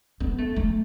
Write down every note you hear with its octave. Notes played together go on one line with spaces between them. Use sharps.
B3
A3
A3